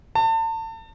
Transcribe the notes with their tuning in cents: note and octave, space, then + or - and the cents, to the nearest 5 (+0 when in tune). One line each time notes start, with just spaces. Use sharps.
A5 +35